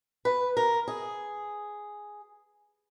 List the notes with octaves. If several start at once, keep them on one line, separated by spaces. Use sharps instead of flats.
B4
A#4
G#4